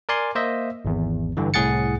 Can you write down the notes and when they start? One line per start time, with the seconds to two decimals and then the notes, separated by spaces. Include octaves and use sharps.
0.09 A#4 D5 G#5 C6
0.35 A#3 C5 D#5 E5
0.85 G#1 E2
1.37 G2 D3 E3
1.54 C2 A2 G#4 F#5 A6 C#7